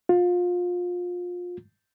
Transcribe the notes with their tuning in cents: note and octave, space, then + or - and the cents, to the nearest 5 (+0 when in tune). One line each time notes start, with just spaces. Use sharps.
F4 +25